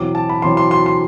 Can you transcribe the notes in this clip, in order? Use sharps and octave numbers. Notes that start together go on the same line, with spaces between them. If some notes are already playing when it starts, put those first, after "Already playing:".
Already playing: E2 B2 F#3 C4 D6
A5
B5
E2 B2 F#3 C4 C6
C6
C6
C6